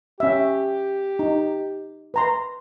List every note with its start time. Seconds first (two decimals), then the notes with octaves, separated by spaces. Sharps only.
0.20 C#4 G4 E5
1.19 D#4
2.14 B4 A#5 C6